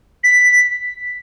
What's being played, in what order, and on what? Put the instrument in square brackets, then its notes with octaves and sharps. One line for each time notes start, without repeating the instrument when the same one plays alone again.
[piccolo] B6